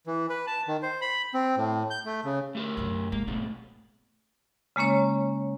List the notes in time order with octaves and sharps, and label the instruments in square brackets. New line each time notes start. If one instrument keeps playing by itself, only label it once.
[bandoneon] E3
B4
A5
D#3
C5
B5
C4
A2
G6
A3
C#3
[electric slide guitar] A3 G4 A#4
[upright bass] F#2 C3
[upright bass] G#3 [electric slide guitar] A#3
[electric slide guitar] G#2 B2 G3 [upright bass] A3
[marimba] C#3 G#3 A#3 C#4 C#5